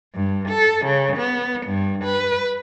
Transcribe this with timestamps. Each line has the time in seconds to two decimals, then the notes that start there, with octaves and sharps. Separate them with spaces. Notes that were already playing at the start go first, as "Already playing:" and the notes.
0.15 G2
0.49 A4
0.86 C#3
1.17 B3
1.67 G2
2.04 B4